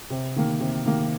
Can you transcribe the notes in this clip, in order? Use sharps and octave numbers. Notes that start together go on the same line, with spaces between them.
C3
D#3 A#3
C3
D#3 A#3